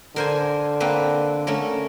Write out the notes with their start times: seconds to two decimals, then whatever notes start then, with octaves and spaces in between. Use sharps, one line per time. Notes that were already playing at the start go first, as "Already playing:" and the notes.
0.16 D3 A#4 C5 G#5
0.80 A#3 C4 B4
1.47 A3 C#4 A#4